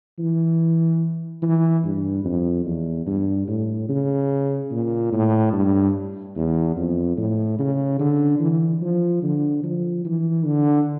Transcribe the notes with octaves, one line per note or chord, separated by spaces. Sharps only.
E3
E3
G2
F2
E2
G2
A2
C#3
A#2
A2
G2
E2
F2
A2
C#3
D3
E3
F3
D3
F3
E3
D3